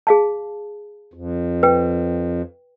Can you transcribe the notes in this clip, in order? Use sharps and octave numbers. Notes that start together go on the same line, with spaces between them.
G#4 F5 A5
F2
B4 G5